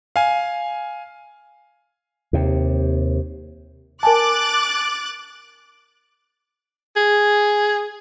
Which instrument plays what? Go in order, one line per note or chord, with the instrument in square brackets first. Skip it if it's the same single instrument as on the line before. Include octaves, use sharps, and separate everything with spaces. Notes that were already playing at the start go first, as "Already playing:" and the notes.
[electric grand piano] F5 G#5
[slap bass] D#2 C3
[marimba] A#4 G#5 A5 [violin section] D6 F#6 A6
[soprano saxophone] G#4